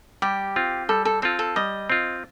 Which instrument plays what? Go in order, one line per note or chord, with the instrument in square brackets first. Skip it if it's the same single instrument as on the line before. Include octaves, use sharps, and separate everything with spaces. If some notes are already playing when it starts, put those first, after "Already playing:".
[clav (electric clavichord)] G3 [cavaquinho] G4
[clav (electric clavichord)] C4 F4
[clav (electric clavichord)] G3 [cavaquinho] A4
[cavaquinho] A4
[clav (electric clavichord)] C4 F4 [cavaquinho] A4
[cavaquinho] A4
[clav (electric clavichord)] G3 [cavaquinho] D#5
[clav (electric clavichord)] C4 F4